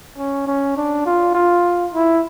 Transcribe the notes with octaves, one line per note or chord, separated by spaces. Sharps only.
C#4
C#4
D4
F4
F4
E4